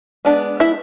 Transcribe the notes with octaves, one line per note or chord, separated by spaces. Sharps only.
G#3 B3 D4
E4 E5